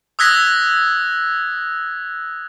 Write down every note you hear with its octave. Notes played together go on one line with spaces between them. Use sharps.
D#6 E6 F#6 G#6 A#6 B6